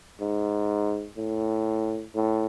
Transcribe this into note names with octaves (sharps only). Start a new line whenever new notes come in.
G#2
A2
A2